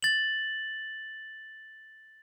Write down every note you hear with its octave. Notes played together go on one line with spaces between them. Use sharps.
A6 F#7